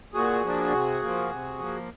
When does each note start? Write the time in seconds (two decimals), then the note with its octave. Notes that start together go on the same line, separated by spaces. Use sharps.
0.14 A#2 F#4 G#4
0.44 F3 A#3 D4
0.72 C3
1.02 F3 A#3
1.31 C3
1.59 F3 A#3